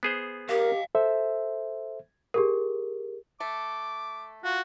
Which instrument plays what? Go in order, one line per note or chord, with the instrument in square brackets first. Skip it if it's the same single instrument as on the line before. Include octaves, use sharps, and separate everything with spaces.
[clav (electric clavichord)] B3 G#4 C5
[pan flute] G4 [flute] A#4 [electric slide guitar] D#5 F5
[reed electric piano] A4 C5 E5
[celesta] G4 G#4 A#4
[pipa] A3 [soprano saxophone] D6
[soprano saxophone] F4 [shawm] F#4